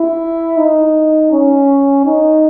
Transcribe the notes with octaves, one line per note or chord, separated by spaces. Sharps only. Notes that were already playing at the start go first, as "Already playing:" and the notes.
Already playing: E4
D#4
C#4
D#4